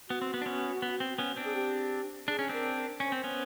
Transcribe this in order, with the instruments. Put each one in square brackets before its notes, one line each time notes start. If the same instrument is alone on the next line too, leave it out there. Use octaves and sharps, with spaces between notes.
[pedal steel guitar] B3 [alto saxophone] F#4
[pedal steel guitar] C4
B3
D4
B3 C#4
B3
C4
B3 C#4
C4 D4
[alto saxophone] G#4
G4
[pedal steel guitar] D4 [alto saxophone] G#4
[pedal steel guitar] C#4
[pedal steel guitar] C4 D4 [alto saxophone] A#4
[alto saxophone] A#4
[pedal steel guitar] C#4 [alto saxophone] C5
[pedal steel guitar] C4
B3 C#4